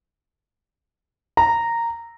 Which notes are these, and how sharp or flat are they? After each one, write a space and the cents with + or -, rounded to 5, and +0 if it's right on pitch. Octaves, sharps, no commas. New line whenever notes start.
A#5 -10